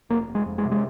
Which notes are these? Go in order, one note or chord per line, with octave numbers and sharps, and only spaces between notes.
F1 A#3
F1
G#3
F2
G#3
C3
G#3